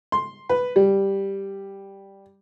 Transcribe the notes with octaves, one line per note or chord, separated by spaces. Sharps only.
C6
B4
G3